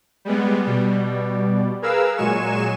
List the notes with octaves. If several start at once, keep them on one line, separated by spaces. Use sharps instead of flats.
G3 G#3 B3
B2 G3
G#4 A#4 B4 F5 E6
A#2 F#3 G#3 G#5 C#6 E7